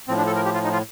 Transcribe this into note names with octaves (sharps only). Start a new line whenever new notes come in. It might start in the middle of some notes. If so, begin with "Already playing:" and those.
A2 F3 C4
D4
A4
A#4
G4
F4
D#4
F4